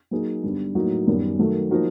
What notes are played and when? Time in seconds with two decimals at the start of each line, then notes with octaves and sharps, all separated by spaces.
0.11 F#3 A#3 D#4 G#4
0.43 G2 D3 G3 B3
0.75 A2 F#3 A#3 D#4 F#4
1.07 F#2 D#3 G3 B3
1.39 D#3 F#3 A3
1.71 F3 A#3 D#4 F#4 A#4